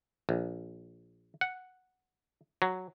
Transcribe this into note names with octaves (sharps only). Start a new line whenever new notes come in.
A#1
F#5
F#3